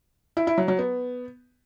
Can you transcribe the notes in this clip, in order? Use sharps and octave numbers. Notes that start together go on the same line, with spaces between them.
E4
E4
F#3
F#3
B3